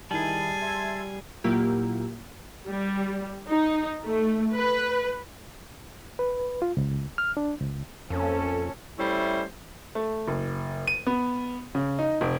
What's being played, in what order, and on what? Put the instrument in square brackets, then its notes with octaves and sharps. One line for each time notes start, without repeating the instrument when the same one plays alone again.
[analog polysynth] D#3 D#4 E4 [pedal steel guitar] G3 G#4 [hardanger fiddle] G#5 [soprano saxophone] A5
[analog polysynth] E5 C6 G#6
[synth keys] A#2 F#3 A#3 E4 F4 G4
[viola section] G3
D#4
A3
B4
[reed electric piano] B4
F4
C#2
F6
D4
C#2
[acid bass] F2 [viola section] A#3 C#4 A4
[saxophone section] G3 A3 C#4 E4 C5
[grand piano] A3
F#1
D#7
B3
C#3
D#4
F1